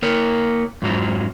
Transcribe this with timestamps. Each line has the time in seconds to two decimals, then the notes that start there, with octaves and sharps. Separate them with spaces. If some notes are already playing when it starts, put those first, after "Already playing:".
0.02 A#3 A#4 C#5
0.82 F2 G#2 F3 F#3